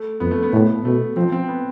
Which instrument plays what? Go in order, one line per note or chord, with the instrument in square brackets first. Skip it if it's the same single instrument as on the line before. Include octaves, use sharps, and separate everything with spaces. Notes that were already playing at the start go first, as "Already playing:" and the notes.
Already playing: [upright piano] A3
[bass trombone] F2 [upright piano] B3
[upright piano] A3
B3
[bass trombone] A2
[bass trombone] B2 [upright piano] A3
[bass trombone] F3 [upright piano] C4
[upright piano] C4
B3